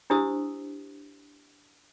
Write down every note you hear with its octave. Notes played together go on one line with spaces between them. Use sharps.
D4 E4 G4 C5 D#6 E6